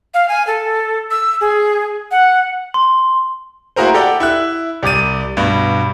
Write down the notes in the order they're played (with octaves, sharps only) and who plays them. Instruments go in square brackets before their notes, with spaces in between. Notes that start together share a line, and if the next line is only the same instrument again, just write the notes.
[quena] F5
G#5
A4
E6
G#4
F#5
[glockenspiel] C6
[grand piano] A#3 E4 F#4 G#4 A#4 C5
G4 A4 D5 F#5 G5
E4 E5 F#6
C2 G4 D6 A6 D#7
G2 B2